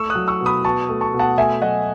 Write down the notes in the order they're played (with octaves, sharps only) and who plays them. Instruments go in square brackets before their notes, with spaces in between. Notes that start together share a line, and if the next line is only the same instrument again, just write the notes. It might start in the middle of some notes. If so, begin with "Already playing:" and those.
Already playing: [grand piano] A3 C#6 E6
D#6 F#6
F#3
C#6 E6
B2
B5 D#6
B2 A5 C#6
A3
A5 C#6
B2
F#5 A5
A3 E5 G#5
F#3 D#5 F#5